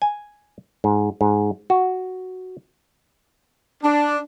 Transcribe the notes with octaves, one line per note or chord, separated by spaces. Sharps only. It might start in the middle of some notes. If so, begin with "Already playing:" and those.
G#5
G#2
G#2
F#4
D4